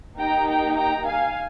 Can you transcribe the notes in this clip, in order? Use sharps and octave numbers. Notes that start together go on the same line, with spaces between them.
A#3 D#4 G4 G5 A#5
G5 A#5
G5 A#5
F5 G#5